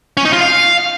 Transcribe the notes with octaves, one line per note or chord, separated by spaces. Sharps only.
C#4
D#4
F4
F5